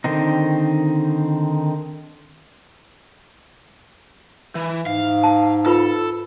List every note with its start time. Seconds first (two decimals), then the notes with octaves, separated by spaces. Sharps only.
0.04 D3 D#3 C4 D#4
4.55 E3
4.86 G#2 F5
5.23 A5
5.66 F4 A4 B4 B5